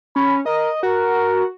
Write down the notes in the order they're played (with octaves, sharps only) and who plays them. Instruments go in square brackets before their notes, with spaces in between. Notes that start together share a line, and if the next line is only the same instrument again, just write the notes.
[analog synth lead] C#4 [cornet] B5
[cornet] A#4 [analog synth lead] D#5
[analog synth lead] F#4 [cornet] A#4